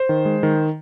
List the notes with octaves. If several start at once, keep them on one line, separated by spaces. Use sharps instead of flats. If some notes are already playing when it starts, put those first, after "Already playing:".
Already playing: C5
D#3
G#3
D#3